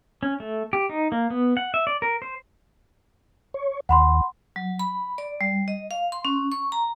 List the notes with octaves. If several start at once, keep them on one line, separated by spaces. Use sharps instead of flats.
C#4
A3
G4
D#4
A#3
B3
F#5
E5
D5
A#4
C5
C#5
D#2 F#5 B5 C6
F#3
B5
D5
G3
D#5
F5
C6
C#4
C#6
A#5